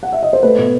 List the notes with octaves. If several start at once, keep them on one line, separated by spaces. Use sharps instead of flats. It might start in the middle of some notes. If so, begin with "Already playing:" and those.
F#5
E5
D#5
C5
A3 B4
B2